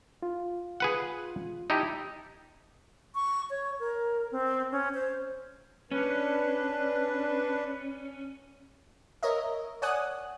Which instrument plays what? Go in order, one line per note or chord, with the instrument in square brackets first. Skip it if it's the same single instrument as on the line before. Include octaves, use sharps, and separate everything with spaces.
[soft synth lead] F4
[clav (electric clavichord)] G#4 B4 F#5
[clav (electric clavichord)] D#4 E4 G4 [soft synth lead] A5
[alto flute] C#6
C#5
A#4
C4
C#4
C5
[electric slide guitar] C#4 [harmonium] D4 B4
[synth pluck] A#4 C#5 D#5 E5
C#5 D5 F#5 G#5 D#6 F#6